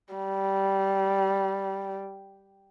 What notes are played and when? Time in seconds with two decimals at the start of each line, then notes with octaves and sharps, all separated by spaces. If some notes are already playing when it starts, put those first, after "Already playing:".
0.14 G3